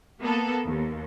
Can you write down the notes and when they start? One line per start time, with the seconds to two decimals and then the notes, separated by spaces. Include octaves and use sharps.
0.21 A#3 B3 A4
0.65 D#2